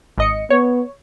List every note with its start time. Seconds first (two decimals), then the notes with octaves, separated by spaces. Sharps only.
0.18 G#1 D#5 C#7
0.50 B3 C#5